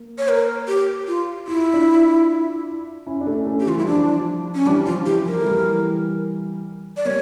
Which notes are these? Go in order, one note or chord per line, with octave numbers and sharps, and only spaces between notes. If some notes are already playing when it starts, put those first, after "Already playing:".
Already playing: A#3
C#5
A#4
G4
F4
E4 F4
D4 F4
C#4 E4
D4
A3 C#4
A3 C#4
G4
E3 F4
G3 E4
F3 D4
C#4
E3 G3 D4
F3 F4
E3 G4
F3 A#4
A3
E3 G3
D5
G3 A#3 C#5